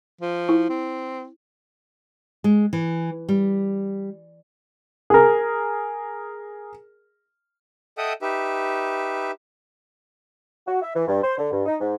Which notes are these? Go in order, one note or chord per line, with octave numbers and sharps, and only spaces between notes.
F3
E4
C4
G#3
E3
G3
G#4 A#4
A4 D#5 E5 F#5 G5 D#6
D#4 G4 B4 E5
F#4
E5
E3
G2
C5
D3
G2
D#4
G#2